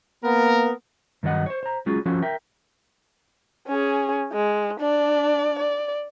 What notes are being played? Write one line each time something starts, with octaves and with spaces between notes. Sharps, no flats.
A#3 B3 A#4
G2 D#3 F#3 D#5 F#5
C5 C#5
C5 A#5
F#3 G#3 C#4 F4 F#4 G#4
F3 C#4 F#4 A4
A#4 E5 G5
C#4 G#4
G#3
D4 D5
D5